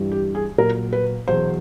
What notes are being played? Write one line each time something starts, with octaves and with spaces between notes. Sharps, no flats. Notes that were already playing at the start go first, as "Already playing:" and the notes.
Already playing: G2 E3 G3
G4
G#4
A#2 F#3 A#4
B4
E2 B2 F#3 C5